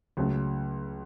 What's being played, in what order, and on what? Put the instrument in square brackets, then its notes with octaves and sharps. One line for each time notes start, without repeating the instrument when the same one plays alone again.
[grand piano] C#2 C#3 F#3 A3